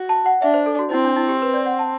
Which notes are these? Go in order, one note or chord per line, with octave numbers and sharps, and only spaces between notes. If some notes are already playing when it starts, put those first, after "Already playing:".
Already playing: F#4
A5
F#5
D4 E5
C5
A4
F#4
C4 E4
D4
E4
G4
B4
D5
F#5
A5